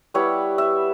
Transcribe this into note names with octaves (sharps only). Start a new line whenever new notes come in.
G3 B3 E4 C#5
E5